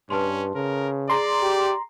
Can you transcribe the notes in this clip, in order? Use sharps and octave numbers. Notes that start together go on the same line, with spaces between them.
G2 C#4 B4 A5 C6
C#3 A#4
G#4 D5 A#5 C6
G4